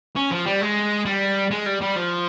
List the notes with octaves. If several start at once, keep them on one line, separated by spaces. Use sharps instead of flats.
C#4
F3
G3
G#3
G3
G#3
G3
G3
F3